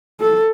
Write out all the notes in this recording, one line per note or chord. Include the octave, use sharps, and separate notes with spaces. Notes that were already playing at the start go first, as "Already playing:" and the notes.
A4